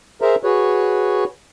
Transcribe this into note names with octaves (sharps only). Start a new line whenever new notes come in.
G#4 A#4 C5 E5 A#5
F#4 G#4 B4 C#5